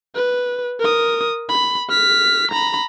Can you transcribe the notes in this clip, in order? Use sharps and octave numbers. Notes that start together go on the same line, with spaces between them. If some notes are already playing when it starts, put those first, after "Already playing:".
B4
A#4 D#6
B5
F6 B6
A#5 B5